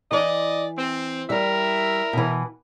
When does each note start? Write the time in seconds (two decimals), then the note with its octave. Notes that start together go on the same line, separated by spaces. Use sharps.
0.12 E3 D5 D#5
0.78 C4
1.30 G3 E4 A#4 E5
2.13 B2 E3